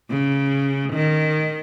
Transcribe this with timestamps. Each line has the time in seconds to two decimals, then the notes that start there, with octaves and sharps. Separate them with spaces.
0.10 C#3
0.93 D#3